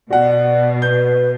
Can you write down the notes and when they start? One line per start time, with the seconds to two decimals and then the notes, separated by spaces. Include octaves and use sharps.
0.10 B2 F#4 D5 F#5
0.82 B4 G6